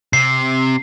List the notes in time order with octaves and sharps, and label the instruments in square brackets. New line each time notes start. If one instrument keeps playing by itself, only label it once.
[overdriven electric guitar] C3 [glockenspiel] C7